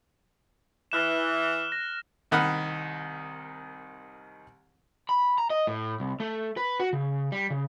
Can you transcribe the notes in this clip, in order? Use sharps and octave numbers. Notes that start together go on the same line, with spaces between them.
E3 F6 F#6 E7
A#6
C2 D#3 F#5 B5 D#6 F6
B5
A#5
D#5
A2
C2
A3
B4
F#4
C#3
G3
C#3